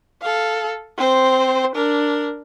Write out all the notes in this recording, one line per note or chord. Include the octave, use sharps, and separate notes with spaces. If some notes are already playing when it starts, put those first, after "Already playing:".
A4 F5
C4 C5
D4 A#4